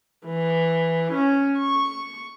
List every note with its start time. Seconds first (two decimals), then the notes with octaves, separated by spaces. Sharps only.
0.25 E3
1.13 C#4
1.59 C#6